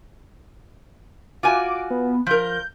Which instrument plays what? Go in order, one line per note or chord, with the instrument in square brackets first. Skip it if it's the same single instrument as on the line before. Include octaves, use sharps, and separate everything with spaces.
[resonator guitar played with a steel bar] F4 F#4 G#5 [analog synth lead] D6
[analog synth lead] B3
[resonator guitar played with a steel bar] F3 A#4 [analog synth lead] G6